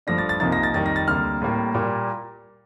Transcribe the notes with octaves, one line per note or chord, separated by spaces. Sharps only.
G2 F3 A3 D4 A#6
A6
A6
C2 C3 F3 A#3 D#4 A6
A#6
A6
F2 D#3 G3 A6
A#6
A6
D2 C3 G3 A#3 F6
A2 G3 A#3
A#2 G3 A#3